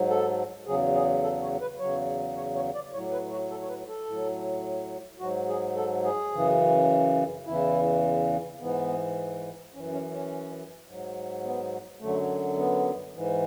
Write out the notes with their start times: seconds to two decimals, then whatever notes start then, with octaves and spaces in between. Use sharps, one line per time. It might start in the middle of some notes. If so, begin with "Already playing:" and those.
Already playing: G#2 F#3
0.10 A4
0.66 E2 C#3 F#3 G#4
0.95 G#4
1.23 A4
1.42 C#5
1.61 B4
1.79 E2 C#3 F#3 C#5
2.36 C#5
2.55 C#5
2.74 D5
2.93 A2 C#5
2.96 F#3
3.12 B4
3.31 F#4
3.50 A4
3.62 C#5
3.68 B4
3.88 A4
4.06 A2 F#3
5.20 G#2 F#3 F#4
5.49 G#4
5.76 A4
6.05 G#4
6.33 F#2 C#3 E3
7.46 E2 C#3 E3 E4
8.60 G#2 E3 B3
9.73 F#2 E3 C#4
9.92 C#4
10.11 C#4
10.87 G#2 F#3
11.44 B3
12.00 F#2 D3 F#3 A3
12.57 B3
13.13 G#2 E3